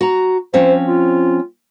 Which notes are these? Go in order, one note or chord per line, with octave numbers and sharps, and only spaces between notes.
F#4 A#5
F3 C4 C#4 C5
F4